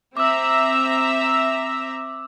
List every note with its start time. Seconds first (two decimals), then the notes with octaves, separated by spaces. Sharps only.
0.17 C4 E5 A#5 D6 E6